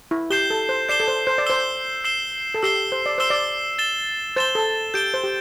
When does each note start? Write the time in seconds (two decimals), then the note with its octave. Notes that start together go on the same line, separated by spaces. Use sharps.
0.11 E4
0.30 G4 G6 C7 E7 G7
0.50 A4
0.69 C5
0.89 D5 G6 C7 E7 G7
1.00 A4
1.08 C5
1.27 C5
1.38 D5
1.46 C5 E6 C7 E7 G7
2.04 E6 C7 E7 G7
2.54 A4
2.63 G4 E6 C7 E7 G7
2.92 C5
3.06 D5
3.18 C5 E6 C7 E7 G7
3.30 D5
3.79 A6 E7 G7
4.36 C5 A6 E7 G7
4.55 A4
4.94 G4 G6 D7 G7
5.14 C5
5.24 G4